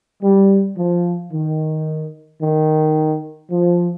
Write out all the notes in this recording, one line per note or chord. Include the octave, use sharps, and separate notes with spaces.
G3
F3
D#3
D#3
F3